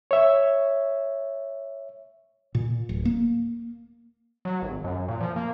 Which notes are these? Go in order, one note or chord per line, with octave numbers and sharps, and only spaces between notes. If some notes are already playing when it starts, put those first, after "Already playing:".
C#5 E5
A#2
D1
A#3
F#3
G#1
F#2
A#2
F3
A#3